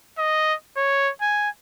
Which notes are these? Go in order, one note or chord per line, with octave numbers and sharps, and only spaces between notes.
D#5
C#5
G#5